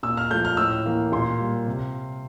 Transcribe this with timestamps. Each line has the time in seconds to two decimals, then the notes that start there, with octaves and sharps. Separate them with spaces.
0.03 A#2 E6
0.17 F6
0.30 F3 A3 G6
0.45 F6
0.57 A2 E6
0.85 E3 A#3
1.12 A#2 C6
1.40 G3 A#3
1.66 C3